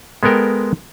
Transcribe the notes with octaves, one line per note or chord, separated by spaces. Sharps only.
G#3 B3 A4 A#4 G5